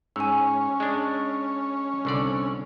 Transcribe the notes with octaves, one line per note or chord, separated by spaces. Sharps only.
G#2 C#4 G#5 E6
G#3 D4
C2 D3 D5